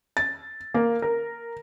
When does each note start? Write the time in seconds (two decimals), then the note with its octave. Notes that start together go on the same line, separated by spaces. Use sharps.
0.17 A6
0.74 A#3
1.02 A#4